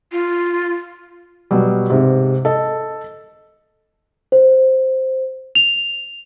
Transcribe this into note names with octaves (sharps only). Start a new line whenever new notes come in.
F4
B2 F#3 G3
G#2 C3
A4 D#5
C5
F7